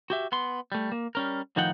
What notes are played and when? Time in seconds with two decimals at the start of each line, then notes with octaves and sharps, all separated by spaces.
0.10 F#4 G4 E5
0.32 B3 C6
0.72 G3 A3
0.92 A#3
1.15 G3 C#4 A#4
1.56 A2 D#3 F3 D#4 F#5 G5